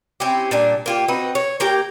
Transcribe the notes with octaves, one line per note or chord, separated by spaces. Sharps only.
C4 C#4 E4 G4
A#2 G3 D4
A#3 F4 G4
C4 D#4 F#4 B4
C#5
A#3 G4 A#4 G5